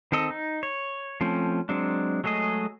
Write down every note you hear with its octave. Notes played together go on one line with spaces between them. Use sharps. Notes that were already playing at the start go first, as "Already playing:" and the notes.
D#3 C4 A4 D#5
D#4
C#5
F3 A3 C4 C#4
F#3 G#3 C4 D4
F#3 G#3 A3 G#4 D#5